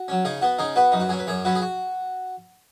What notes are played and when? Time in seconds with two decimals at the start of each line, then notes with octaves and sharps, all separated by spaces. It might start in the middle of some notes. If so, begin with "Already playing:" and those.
Already playing: F#4
0.08 F#3 C#4
0.25 C#3 D#4 G#4
0.41 B3 F#4
0.58 C#3 D#4 G#4
0.76 B3 F#4 B4
0.92 F#2 D#4
1.00 F#4
1.09 F#3 C#4 G#4
1.19 B4
1.27 F#2 G#4 C#5
1.45 F#3 C#4 F#4 B4
1.55 G#4
1.62 F#4